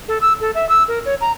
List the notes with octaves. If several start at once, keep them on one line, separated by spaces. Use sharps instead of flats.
A4
E6
A4
E5
E6
A#4
C#5
A#5